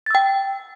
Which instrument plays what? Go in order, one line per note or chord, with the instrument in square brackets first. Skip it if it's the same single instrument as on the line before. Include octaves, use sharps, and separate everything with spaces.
[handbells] A6
E6
G5